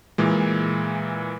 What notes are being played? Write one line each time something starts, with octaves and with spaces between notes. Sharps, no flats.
A#2 E3 G#3